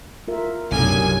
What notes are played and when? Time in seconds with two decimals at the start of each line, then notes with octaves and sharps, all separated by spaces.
0.28 F4 A#4 E5
0.71 B1 F#2 A2 C3 D4 A4 G#5